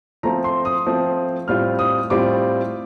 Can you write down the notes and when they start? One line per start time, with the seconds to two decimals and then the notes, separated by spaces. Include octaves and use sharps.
0.23 F3 A3 C4 A#5
0.44 C6
0.65 D#6
0.86 F3 A3 C4
1.48 A2 G3 C4 F4 F6
1.79 D#6
2.10 A2 G3 C4 F4 D6